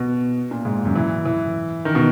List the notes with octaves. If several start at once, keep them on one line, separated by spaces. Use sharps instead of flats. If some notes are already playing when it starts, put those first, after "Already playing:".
Already playing: B2
A#2
G#2
F#2
E3
E3
D#3
B2